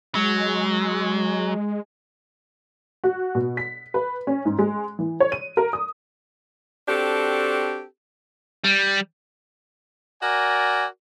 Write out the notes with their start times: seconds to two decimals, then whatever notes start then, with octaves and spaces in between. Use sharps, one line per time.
0.15 F#3 G#3
3.04 F#4
3.35 B2
3.57 B6
3.94 B4
4.27 C#4
4.45 G#2
4.59 G#3
4.99 E3
5.20 C#5
5.32 D#7
5.57 A#4
5.73 D#6
6.89 C4 D4 F#4 G4 A4
8.64 G3
10.21 F#4 A#4 D5 G#5